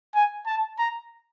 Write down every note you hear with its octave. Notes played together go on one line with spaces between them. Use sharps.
G#5
A5
A#5